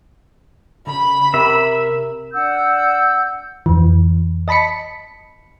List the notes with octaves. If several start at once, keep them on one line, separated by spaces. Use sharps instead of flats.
C#3 B5
C3 A#4 E5
D4 F#5 E6 G6
F2 E3
D#5 A5 B5 B6 C#7